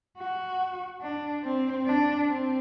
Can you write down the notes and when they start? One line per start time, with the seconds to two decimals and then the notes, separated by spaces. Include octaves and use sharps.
0.18 F#4
1.01 D4
1.44 C4
1.86 D4
2.28 C4